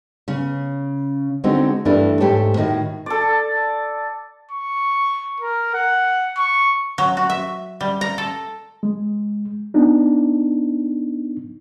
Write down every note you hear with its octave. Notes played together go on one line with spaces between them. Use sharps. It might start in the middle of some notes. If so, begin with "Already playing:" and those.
C#3 C#4
D3 G#3 C4 D#4 F#4
G2 E3 G3 A3 D4 E4
G#2 A3 G4 C#5 A5
A2 D#3 F#4
A4 D5
C#6
A#4
F#5
C#6
F#3
F#4
E5
G3
A#5
A4
G#3
B3 D4 D#4